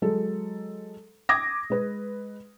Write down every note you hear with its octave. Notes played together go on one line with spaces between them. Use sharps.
F#3 G#3 A4
D6 D#6 G#6 A#6
G#3 B4